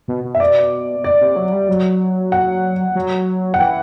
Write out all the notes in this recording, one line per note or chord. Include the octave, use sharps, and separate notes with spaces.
B2
B2
E5
D5
D5
C3
F#3
G3
F#3
F#5
F#3
F#5
E3 G5